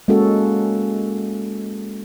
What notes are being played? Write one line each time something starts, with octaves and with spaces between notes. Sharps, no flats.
G#3 A#3 C#4 F#4 A4